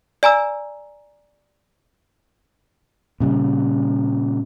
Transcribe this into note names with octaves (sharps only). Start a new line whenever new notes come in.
D5 G#5 A#5 E6
A#2 C#3 G3